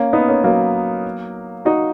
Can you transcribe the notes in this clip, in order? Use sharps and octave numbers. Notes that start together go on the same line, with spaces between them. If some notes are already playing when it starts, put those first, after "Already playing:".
Already playing: A#3 C#4
B3 D#4
A#3 C#4
F#3 A#3
D#4 F#4